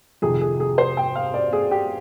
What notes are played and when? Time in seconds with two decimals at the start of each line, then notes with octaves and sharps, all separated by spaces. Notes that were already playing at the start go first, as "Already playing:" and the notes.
0.22 F2 C3 D#3 G#4
0.41 G#4
0.60 G#4
0.78 C5
0.97 G5
1.15 F5
1.34 D5
1.53 G#4
1.71 G4